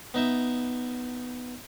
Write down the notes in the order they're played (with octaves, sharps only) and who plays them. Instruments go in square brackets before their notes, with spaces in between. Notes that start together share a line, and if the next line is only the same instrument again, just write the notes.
[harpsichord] B3 D#4 E5